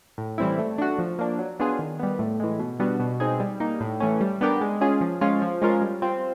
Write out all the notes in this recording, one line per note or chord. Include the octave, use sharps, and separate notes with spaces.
A2
E3 G3 C4 E4
A3
D4 F#4
F3
A#3 D4
F#3
B3 D4 F4 G#4
D#3
G3 B3
A2
E3 G#3
B2
G3 B3 D4 F#4
B2
G#3 C4 D#4 G#4
G3
A#3 D#4
A2
E3 A3 C#4
G3
B3 D4 G4 A#4
G#3
C#4 F4 G#4
F3
G#3 C#4 F4
F3
G#3 C#4 F4 A#4
G3
C4 F4